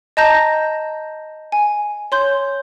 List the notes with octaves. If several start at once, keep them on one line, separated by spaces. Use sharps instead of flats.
D#5 A5 A#5 G6 A#6
G#5
C#5 C6 G6